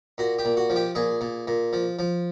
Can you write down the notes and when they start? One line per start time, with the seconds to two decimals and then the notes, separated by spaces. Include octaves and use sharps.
0.18 A#2 F#4
0.39 G4
0.45 A#2
0.57 F#4
0.70 F3
0.76 G4
0.95 A#2 G#4
1.21 A#2
1.47 A#2
1.73 F3
1.99 F3